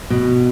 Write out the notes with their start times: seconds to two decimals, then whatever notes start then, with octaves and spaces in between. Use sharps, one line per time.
0.10 B2